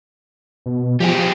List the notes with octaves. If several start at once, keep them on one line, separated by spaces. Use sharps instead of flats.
B2
F3 G3 G#4